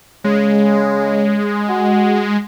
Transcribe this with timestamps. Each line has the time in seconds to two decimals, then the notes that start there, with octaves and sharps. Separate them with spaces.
0.24 C#3 G#3
1.69 F#4